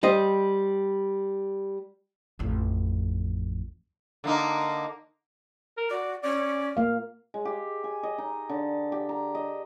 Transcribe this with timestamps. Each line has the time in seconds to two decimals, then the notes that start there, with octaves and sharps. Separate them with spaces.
0.03 G3 C5 D#5
2.39 A1 F2
4.24 D3 A#3 D#4
5.77 A#4
5.90 F#4 D5
6.23 C#4 D5
6.77 A#3 F5
7.34 G#3
7.45 G4
7.84 G#5
8.03 D#5
8.18 D#4
8.49 D3
8.92 G4
9.09 A#5
9.35 D#5